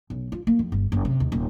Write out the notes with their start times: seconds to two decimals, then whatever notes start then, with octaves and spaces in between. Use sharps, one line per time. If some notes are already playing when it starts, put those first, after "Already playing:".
0.10 B1
0.32 F4
0.47 A#3
0.59 F2
0.72 G1
0.92 F#1
1.05 C3
1.20 D#2
1.32 D#1